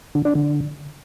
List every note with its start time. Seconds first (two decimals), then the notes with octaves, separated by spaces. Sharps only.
0.15 D3
0.25 D4
0.35 D3